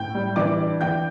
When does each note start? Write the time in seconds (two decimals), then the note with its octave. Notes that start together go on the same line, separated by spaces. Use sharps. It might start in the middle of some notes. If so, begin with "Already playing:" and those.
Already playing: A2 G5 G6
0.15 G3
0.36 E3 D5 D6
0.58 D4
0.81 E3 G5 G6